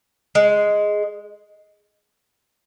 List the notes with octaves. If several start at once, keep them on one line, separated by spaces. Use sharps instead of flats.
G#3